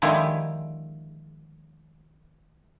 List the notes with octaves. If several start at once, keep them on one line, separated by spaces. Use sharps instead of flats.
D3 D#3 F3 G#3 E4 G4